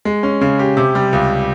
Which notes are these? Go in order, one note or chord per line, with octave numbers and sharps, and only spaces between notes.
G#3
C#4
C#3
G4
C3
G3
C#2